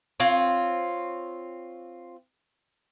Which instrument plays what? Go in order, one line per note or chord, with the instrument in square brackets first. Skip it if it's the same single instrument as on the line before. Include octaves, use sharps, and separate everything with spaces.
[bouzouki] C4 F4 C#5